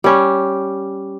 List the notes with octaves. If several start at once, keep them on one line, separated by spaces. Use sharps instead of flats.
G3 C#4